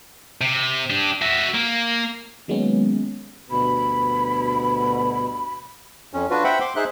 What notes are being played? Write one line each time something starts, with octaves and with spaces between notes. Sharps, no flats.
C3
D4 G4
F#4 E5
A#3
D#3 F#3 G#3 A#3 B3 C#4
D2 G2 B2 B5
F2 C#4
D4 F4 F#4 B4
C5 E5 F#5 G5 B5
C6 D6
D#4 G#4 C5 E5 F#6